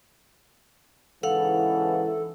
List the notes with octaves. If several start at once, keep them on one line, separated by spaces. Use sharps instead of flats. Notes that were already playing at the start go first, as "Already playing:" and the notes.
G#2 C#3 E3 A4 F5 F#5